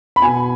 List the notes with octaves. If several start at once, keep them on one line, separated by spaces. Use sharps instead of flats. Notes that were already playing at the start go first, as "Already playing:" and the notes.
B5
B2 G#5